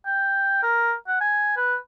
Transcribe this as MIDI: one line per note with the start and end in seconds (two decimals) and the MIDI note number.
0.06 0.59 79
0.63 0.93 70
1.08 1.20 78
1.21 1.54 80
1.57 1.76 71